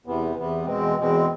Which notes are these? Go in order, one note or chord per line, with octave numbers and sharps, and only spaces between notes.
E2 C3 E3 B3
E2 C3 E3 B3
E2 B2 G#3 C4
E2 B2 G#3 C4